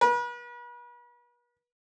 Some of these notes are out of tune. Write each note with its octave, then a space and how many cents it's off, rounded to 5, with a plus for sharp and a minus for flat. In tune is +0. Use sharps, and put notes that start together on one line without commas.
B4 -40